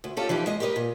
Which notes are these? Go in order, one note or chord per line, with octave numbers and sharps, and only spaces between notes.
D2
C#4 D#4 F4 G4 A4
E3 F3 D#4 G4
G#3 D#5
G4 A#4 B4 D5 D#5
A#2